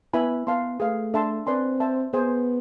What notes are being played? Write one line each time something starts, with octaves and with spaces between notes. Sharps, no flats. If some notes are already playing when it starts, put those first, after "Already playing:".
B3 E4 B4 E5 G#5 B5
B3 B4 F5 A5 C6
A3 G#4 B4 F5
D4 A4 E5 A5 C6
C4 B4 D5 G#5 C6
C5 E5 A5
B3 G#4 C5 G#5